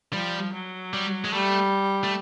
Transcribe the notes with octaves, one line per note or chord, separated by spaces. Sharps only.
F3 G3
F#3
G3
G#3
G3 A3
A3